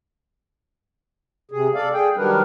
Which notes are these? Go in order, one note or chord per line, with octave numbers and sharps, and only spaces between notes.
C3 G#4
A4 D5 F5
G#4 G5
D#3 F#3 G3 D4 A#4 B4